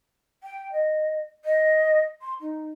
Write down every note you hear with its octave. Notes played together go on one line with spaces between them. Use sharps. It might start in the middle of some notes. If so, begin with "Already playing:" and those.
G5
D#5
D#5
C6
D#4